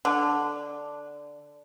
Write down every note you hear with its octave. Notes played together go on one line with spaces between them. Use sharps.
D3